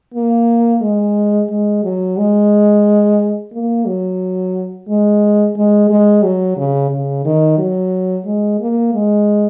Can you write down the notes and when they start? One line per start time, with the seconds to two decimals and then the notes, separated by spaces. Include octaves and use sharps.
0.15 A#3
0.81 G#3
1.50 G#3
1.84 F#3
2.17 G#3
3.53 A#3
3.86 F#3
4.89 G#3
5.56 G#3
5.90 G#3
6.23 F#3
6.57 C#3
6.91 C#3
7.25 D#3
7.58 F#3
8.26 G#3
8.60 A#3
8.94 G#3